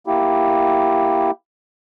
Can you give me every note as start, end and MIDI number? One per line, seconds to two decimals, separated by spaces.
0.07 1.31 58
0.07 1.31 64
0.07 1.31 67